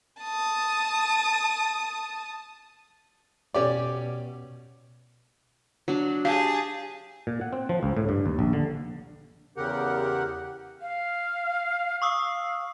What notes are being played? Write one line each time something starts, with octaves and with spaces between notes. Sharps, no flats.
A5 D#6
B2 C#4 G4 D5
F#3 D4
G4 G#4 F5 A5
A#2
F#5
C4
F3
C#2
A2
G2
D#2
A#1
D3
E2 C#3 G4 A#4 F#5
F5
F5 C#6 D#6 E6